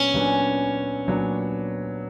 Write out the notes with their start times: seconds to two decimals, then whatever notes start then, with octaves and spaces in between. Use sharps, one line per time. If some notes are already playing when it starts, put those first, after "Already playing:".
Already playing: A#2 F#3 B3 C#4 D4
0.14 A#2 F#3 B3 D4
1.07 A#2 F#3 B3 D4